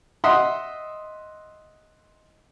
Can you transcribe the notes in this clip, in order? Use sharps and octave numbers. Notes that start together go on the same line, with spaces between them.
D#5 E5 F#5 C6 D#6